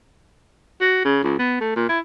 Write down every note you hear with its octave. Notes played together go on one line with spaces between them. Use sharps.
F#4
C#3
C#2
B3
A3
A#2
E4